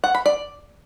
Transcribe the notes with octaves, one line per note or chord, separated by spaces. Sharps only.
F#5
B5
D5